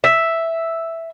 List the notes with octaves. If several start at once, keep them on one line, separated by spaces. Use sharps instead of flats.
E5